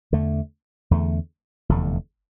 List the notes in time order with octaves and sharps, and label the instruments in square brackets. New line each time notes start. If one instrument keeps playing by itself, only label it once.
[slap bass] E2 D3 A3
E2 D3 A3
F1 E2 D3